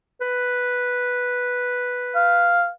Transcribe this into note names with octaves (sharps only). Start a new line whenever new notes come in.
B4
F5